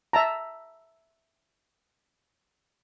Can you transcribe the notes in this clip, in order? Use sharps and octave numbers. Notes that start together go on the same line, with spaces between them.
E5 A5 A#5